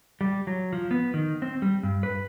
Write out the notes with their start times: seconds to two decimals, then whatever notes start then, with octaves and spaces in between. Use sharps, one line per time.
0.21 G3
0.47 F#3
0.73 F3
0.91 B3
1.14 D#3
1.42 C4
1.62 G3
1.83 G2
2.03 B4